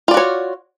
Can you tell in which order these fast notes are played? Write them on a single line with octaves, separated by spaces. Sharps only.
F4 D5 F#4 C#5